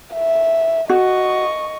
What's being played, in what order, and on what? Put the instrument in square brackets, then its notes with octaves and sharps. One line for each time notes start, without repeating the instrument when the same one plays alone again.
[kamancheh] E5
[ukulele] F#4 [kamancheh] D#5 C#6